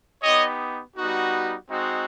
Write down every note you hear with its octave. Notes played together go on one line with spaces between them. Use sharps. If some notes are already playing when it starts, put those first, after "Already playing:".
B3 D#4 G4 C#5 D#5
G3 B3 D#4 F#4
G#3 C4 D#4 F#4